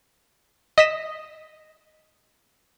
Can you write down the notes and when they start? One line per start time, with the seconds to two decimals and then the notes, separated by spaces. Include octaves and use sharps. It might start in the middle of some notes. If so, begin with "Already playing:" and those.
0.78 D#5 B6 E7